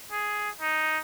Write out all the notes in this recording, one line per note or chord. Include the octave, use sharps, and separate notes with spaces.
G#4
D#4